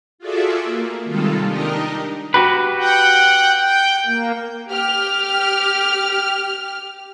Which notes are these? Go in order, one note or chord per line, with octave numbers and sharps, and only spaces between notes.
F4 F#4 G#4 A4 D5 E5
A#3
C3 D#3 G3 G#3 F4 A4
D4 D#4 G4 A#4 D#5
F#4 G4 B4
F#5 G5
G5
A#3
G4 F6